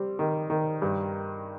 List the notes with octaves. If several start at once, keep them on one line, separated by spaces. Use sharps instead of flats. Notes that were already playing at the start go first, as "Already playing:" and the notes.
Already playing: G3 C4
D#3
D#3
G2